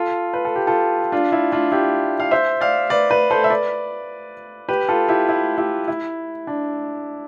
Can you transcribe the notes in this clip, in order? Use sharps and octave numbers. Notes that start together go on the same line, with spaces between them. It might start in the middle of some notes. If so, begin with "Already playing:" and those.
Already playing: F4 A4
B4
A4
G4
F4 A4
D4 F4
E4
D4 F4
E4 G4
F5
C5 E5
D5 F5
B4 D5
B4 D5
A4 C5
E5
B4 D5
G4 B4
F4 A4
E4 G4
E4
E4 G4
E4
D4